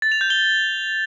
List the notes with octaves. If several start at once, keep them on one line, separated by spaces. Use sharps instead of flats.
A6
F7
G6
G7